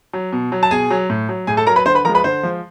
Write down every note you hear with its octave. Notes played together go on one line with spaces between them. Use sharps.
F#3
B2
F#3
A5
B2 G#4 G#5
F#3
A2
F#3
A2 G#4 G#5
A4 A5
F#3 A#4 A#5
B4 B5
D3 C5 C6
B4 B5
F3 G#3 A#4 A#5
B4 B5
D3 C5 C6
F3 G#3